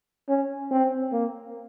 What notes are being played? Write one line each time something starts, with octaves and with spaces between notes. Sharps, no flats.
C#4
C4
A#3